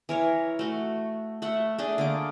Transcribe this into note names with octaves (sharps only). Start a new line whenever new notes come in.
E3 A#4 C#5
A3 F#4
A3 E5 F#5
A3 D4 G#4
D3 A#3 D6